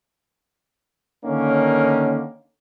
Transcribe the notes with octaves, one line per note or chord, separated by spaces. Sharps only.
D3 D#3 A#3 C#4